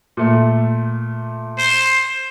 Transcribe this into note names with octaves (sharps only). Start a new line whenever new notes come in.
A#2 A3
C5